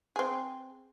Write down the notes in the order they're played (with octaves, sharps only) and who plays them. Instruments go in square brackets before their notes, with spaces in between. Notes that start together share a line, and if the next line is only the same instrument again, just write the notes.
[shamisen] C4 G#4